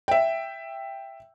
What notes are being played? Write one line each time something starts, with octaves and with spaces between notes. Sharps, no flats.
E5 G5